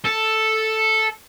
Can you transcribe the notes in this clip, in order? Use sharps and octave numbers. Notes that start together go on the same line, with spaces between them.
A4